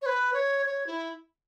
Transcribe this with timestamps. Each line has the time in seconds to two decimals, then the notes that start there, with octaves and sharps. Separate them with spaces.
0.01 C#5
0.06 B4
0.33 C#5
0.66 C#5
0.86 E4